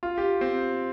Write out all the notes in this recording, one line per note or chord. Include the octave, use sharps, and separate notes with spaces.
F4
G4
C4